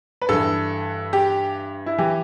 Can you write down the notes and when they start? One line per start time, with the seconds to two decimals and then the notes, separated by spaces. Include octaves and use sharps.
0.22 B4
0.29 G2 E3 A4
1.13 G4
1.86 E4
1.98 E3 G4